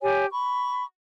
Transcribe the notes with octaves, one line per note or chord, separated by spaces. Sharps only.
G4 C#5 G#5
B5 C#6